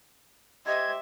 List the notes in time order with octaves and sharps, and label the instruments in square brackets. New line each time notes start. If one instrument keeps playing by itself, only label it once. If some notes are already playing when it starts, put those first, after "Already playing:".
[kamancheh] G4 C5 [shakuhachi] D#5 [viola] E5 [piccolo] G#6